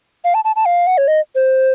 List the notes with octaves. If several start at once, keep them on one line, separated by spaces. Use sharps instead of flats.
F5
A5
A5
A5
F5
F#5
C#5
D#5
C5